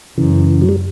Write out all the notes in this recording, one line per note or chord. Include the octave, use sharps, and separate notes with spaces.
F#2 C#3 E3
F#3
G3